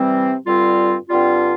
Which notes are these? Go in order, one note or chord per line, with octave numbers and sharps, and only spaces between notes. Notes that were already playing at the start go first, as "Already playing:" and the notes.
Already playing: C3 E3 G3 C4
G2 D3 G3 C4 F4
G2 D3 G3 C4 F4